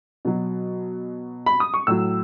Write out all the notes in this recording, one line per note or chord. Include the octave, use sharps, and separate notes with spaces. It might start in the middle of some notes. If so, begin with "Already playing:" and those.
B2 F#3
B5
D#6
C#6
A2 F#3 E6